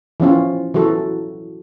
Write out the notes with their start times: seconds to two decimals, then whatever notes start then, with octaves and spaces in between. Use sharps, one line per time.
0.20 E3 F3 C#4 F4
0.74 E3 F#3 F#4 A4